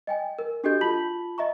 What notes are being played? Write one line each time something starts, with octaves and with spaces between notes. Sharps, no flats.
D#5 G5 G#5
A#4
D4 F#4 G4 A4 D#5 G6
F4 A5 B5 B6 F#7
D#5 E5 A#5 C#6